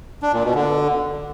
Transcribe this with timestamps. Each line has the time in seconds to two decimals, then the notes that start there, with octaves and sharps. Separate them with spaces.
0.22 D4
0.33 A#2
0.44 B2
0.55 D3